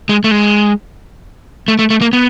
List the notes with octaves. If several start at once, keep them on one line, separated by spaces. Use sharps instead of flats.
G#3
A3
G#3
A3
A3
A3
A#3
B3